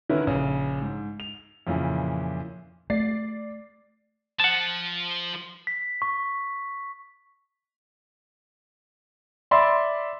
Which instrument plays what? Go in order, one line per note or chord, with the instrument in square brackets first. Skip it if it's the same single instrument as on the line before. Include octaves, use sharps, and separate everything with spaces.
[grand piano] D3 D#3 C#4 E4 A#4 B4
A#1 C#3
G#2
F7
F2 A#2 C#3 E3
[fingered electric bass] A3 [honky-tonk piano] D5 A6 C7
[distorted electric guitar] F3 [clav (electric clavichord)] F#5 A5
[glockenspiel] B6
C#6
[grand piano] D5 E5 B5 C6 D6